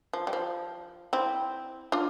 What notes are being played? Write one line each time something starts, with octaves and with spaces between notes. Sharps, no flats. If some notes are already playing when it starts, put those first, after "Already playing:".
F3
G3
F3
C4 E4
D4 F4